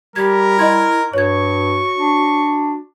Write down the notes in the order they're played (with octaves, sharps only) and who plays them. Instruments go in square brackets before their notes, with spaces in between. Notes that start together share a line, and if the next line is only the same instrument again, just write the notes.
[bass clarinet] G3 [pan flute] G4 [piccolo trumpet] A#4 [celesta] G#6
[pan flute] E4 [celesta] D#5 C6 G#6
[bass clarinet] G2 [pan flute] F#4 [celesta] C#5 G#6 [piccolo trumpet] C#6
[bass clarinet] D4